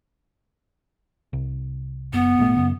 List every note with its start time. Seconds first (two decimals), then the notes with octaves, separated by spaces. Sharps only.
1.33 C2
2.13 F#1 B3
2.39 G#1 A#2 A3
2.56 F#2 C#3